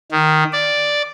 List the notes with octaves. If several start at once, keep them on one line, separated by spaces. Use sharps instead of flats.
D#3
D5